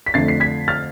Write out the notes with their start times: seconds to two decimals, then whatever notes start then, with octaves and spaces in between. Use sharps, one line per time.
0.06 B6
0.14 F2 D3 A3 A6 C7
0.28 C7
0.40 G#6 B6
0.68 F6 A6